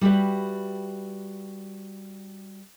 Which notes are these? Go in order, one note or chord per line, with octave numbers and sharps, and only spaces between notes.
G3 E4 F#4 G4 B4 E5